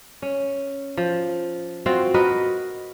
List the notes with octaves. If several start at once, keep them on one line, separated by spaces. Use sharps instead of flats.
C#4
F3
C4 F4 F#4
F#4 A#4 B4 D#5